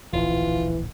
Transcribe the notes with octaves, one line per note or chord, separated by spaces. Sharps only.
D1 A#1 E3 F4